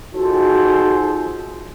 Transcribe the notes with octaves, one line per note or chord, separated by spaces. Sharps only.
D#4 F4 F#4 G#4 A4 C5